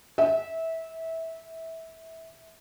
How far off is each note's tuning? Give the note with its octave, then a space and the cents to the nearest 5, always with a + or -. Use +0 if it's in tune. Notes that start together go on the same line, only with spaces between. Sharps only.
E5 -20